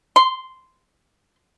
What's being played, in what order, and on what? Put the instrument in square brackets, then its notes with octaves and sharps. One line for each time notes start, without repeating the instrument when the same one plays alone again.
[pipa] C6